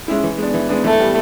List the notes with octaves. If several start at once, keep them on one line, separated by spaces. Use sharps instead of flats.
G#3 C#4 E4
E3
G#3 B3 D4
E3
G#3 B3 D4
E3 A3
G3 B3